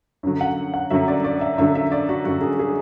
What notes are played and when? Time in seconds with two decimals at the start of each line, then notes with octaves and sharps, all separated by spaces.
0.23 F#2 D3 F#3
0.41 F#5
0.74 F#5
0.90 F#2 D3 F#3 E5
1.08 D5
1.24 D5
1.41 E5
1.58 F#2 D3 F#3 E5
1.75 E5
1.92 D5
2.09 F#4
2.25 F#2 D3 F#3 F#4
2.41 G#4
2.59 G#4